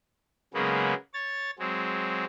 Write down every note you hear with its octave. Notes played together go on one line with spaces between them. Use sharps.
C#3 F#3 G#3 A#3 B3
C#5 A6
F#3 G#3 C4